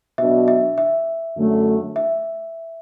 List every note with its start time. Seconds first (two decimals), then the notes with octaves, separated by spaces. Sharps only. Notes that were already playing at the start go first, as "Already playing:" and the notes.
0.18 B2 F#3 D4 E5
0.48 E5
0.78 E5
1.37 F#2 D3 A3
1.96 E5